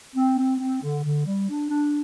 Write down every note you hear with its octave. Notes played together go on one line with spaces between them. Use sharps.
C4
C4
C4
D3
D3
G3
D4
D4